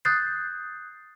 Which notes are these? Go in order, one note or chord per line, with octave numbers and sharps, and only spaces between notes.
D#6 F#6 G6 A6 C7